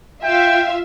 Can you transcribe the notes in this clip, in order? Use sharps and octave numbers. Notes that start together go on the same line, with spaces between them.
F4 E5 F5 G5